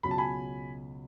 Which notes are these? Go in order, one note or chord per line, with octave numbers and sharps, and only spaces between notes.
C#2 B2 F#3 C#4 B5
A5
G#5 B5